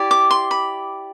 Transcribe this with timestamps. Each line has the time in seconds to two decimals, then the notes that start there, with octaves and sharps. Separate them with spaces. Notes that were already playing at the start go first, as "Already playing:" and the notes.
Already playing: E4 G4 D5
0.11 D6
0.31 C6
0.51 B5